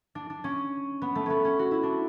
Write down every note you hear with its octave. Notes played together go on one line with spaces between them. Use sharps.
D4
D4
C#4
B3
A3
B3 C#4
C#4
F#4
E4
D4